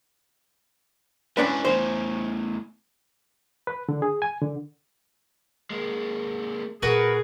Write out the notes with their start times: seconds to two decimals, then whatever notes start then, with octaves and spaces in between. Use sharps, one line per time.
1.37 G#2 C#4 D4 E4 B4
1.65 E2 A2 C5
3.67 B4
3.89 D3
4.02 G#4
4.22 G#5
4.42 D3
5.70 G#3 A#3
6.82 A#2 F#4 G#4 A#4 B4